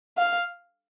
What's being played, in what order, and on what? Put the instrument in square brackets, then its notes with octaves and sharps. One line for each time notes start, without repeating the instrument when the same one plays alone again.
[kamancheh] F5